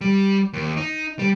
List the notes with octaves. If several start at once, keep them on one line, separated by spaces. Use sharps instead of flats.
G3
D#2
D#4
G3